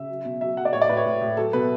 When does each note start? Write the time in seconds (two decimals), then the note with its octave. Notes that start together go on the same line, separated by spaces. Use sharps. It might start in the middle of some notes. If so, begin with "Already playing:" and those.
Already playing: C#3 E5
0.09 F#3
0.25 B2
0.41 F#3 E5
0.57 F#3 F#5
0.65 D5
0.73 A2 C#5
0.82 D5
0.89 A2 B4
0.97 C#5
1.05 A2
1.21 A2
1.37 F#3 A4
1.53 B2 B4